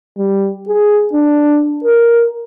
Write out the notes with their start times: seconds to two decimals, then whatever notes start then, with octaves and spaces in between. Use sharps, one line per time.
0.18 G3
0.68 G#4
1.13 D4
1.84 A#4